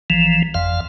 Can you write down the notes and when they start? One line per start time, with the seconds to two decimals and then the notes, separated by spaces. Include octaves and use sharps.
0.10 A#1 E3 F3
0.54 G1 F2 F5